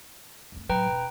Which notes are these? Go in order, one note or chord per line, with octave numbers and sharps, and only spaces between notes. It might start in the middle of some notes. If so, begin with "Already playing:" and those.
F2 A3
A2 F#3 B4 G5 A#5
E1